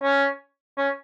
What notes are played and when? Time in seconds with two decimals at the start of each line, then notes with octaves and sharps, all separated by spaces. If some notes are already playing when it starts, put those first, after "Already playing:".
0.03 C#4
0.77 C#4